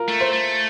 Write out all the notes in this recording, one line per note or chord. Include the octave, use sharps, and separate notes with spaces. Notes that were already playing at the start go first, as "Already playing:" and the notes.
Already playing: F4 A#4
A3
C5
A3